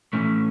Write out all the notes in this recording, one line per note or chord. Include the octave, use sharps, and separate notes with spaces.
A2 E3 A3 C#4